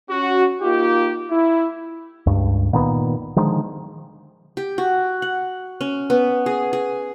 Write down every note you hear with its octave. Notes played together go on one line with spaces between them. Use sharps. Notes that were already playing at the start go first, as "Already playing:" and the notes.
C#4 F#4
A#3 D#4 F4 G4
E4
C#2 G2
A#2 D#3 B3
D3 D#3 F3 G#3
G4
F#4
F#5
C#4
B3
G#4
G#4